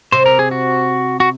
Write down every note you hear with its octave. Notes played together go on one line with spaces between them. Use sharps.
C3 C5
A#4
G#4
F#4
F#4